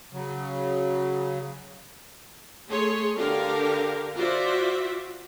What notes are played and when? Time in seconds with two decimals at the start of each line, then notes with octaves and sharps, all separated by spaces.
0.13 C#3 F#3
2.67 A3 G#4 C#5 C6
3.17 D3 G4 A#4 F5
4.15 F4 F#4 C5 D5 E5